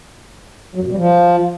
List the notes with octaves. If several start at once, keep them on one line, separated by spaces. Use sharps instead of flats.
F#3
F#2
B2
G3
F3